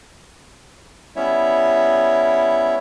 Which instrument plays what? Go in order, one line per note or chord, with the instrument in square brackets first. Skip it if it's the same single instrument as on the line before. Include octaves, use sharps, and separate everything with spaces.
[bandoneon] G3 B3 C#4 E4 C#5 E5